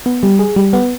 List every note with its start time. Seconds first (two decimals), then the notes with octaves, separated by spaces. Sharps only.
0.06 B3
0.23 G3
0.39 G#4
0.56 G3
0.73 B3